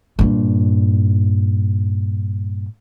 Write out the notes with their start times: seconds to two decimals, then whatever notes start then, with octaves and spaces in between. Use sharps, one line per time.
0.19 G2 A#2